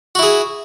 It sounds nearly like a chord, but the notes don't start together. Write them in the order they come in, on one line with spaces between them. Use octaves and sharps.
F#4 E4 G#4